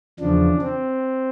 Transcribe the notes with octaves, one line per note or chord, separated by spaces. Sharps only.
E2 C#3 F3 D4
C4